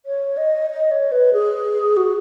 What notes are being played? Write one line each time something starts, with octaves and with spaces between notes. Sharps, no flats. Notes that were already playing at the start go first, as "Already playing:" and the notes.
C#5
D#5
D#5
C#5
B4
G#4
F#4